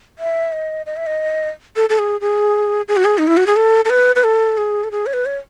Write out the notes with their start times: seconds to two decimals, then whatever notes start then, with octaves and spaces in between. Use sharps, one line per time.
0.19 E5
0.52 D#5
0.86 D#5
0.97 E5
1.06 D#5
1.76 A4
1.90 A4
1.99 G#4
2.21 G#4
2.88 G#4
2.97 F#4
3.05 G#4
3.18 D#4
3.27 E4
3.37 F#4
3.47 G#4
3.56 A4
3.85 A4
3.90 B4
4.16 B4
4.24 A4
4.58 G#4
4.84 A4
4.91 G#4
5.06 C#5
5.13 B4
5.26 C#5